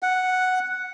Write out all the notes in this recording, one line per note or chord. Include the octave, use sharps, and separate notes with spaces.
F#5